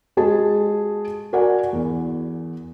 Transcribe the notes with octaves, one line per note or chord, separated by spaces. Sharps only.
G#3 F#4 G#4 D#5 A5
F#4 A#4 D5 F#5 G#5
E2